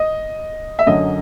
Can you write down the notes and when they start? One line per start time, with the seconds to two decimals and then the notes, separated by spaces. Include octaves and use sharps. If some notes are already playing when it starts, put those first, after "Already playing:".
Already playing: D#5
0.79 E5
0.87 F#2 D3 F#3 D#5